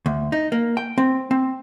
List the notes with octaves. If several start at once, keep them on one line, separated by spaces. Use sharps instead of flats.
D2
D#4
A#3
G5
C4
C4